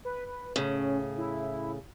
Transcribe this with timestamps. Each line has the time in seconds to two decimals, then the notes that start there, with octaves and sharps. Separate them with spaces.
0.05 B4
0.26 B4
0.56 A2 C#3 C#4
1.17 E4